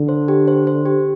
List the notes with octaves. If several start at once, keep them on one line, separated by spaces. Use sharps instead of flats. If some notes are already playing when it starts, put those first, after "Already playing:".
Already playing: D3
C5
G4
C5
C5
G4